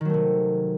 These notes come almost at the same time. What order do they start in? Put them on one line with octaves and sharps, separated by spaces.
D#3 F#3 A3 C3